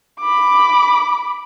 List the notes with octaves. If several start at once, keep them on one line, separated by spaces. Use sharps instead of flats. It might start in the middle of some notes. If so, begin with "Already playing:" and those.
B5 D6